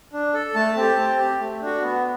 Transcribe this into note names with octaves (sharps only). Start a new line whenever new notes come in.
D4
A4
A3 A5
C4 G4
C4
G4
A3
D4 F#4
B3